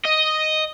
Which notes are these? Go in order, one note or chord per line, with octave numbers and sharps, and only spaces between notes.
D#5